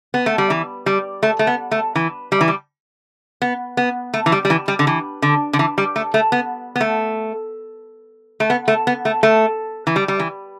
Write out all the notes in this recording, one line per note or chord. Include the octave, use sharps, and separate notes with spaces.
B3
A3
G3
E3
G3
A3
A3
B3
A3
E3
G3
E3
G3
B3
B3
A3
E3
G3
G3
E3
G3
D3
E3
D3
D3
E3
G3
A3
A3
B3
B3
A3
A3
B3
A3
B3
A3
A3
E3
G3
G3
E3